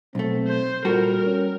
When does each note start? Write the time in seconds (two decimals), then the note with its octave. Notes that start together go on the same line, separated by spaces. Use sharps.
0.15 B1 A3 C4
0.47 C5
0.85 A#2 G3 F#4 A4 A#4
1.26 C#4